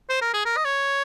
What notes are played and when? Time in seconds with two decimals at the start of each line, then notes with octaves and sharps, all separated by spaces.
0.10 C5
0.21 A#4
0.33 G#4
0.46 A#4
0.57 D#5
0.65 C#5